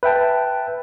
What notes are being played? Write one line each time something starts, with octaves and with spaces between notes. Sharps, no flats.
B4 E5 G5 A5